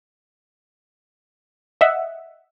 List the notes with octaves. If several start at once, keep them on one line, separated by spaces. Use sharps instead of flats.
D#5 E5 F#5